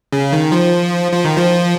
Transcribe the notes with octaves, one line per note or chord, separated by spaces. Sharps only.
C#3
D#3
F3
F3
D#3
F3